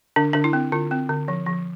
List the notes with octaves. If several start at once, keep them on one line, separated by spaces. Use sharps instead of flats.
D3 D4
D3 D4
E4
C4
D3 F4
C4
D3
F3
F3